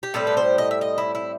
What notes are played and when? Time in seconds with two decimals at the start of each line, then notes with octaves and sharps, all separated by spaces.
0.03 G4
0.14 A2 G3 C4 A4
0.27 B4
0.37 C5
0.58 D#5
0.71 E5
0.81 D#5
0.98 E4
1.15 E4